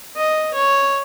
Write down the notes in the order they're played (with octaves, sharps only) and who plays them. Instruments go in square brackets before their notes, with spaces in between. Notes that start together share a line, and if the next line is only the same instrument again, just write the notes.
[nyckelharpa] D#5
C#5